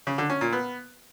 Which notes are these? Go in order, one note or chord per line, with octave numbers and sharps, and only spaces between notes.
C#3
D3
C#4
A#2
B3